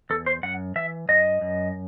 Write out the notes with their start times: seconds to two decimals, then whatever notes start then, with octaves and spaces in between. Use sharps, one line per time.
0.10 E2 A4
0.26 C5
0.43 F#2 F#5
0.76 E3 E5
1.09 F#2 D#5
1.41 F#2